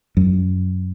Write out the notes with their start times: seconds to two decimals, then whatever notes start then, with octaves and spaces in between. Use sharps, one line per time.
0.17 F#2